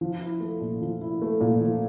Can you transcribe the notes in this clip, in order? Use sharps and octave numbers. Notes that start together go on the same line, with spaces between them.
F3
E4
A3
A#2
F3
E4
A3
A#2
F3